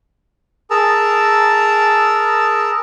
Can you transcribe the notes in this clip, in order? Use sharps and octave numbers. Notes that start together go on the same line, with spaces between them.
G#4 A#4 A5 A#5 E6